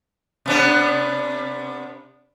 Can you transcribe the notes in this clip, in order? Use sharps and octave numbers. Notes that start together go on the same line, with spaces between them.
C3 B3 D4